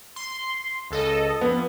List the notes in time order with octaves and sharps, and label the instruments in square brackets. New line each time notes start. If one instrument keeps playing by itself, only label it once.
[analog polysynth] C6
C#2 A4 D#5
[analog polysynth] F2 [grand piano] B3